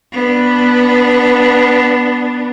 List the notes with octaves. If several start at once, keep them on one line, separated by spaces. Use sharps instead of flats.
B3 D4